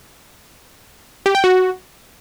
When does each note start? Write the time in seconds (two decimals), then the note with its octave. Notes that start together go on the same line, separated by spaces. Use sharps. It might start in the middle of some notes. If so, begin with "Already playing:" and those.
1.26 G4
1.35 G5
1.44 F#4